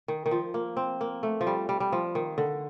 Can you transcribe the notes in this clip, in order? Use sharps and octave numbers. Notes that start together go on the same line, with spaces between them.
D#3
D#3
F3
A#3
C4
A#3
A3
F3
G3
G3
G3
F3
D#3
D3